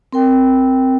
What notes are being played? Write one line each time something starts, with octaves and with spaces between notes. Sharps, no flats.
C4 A#4 G5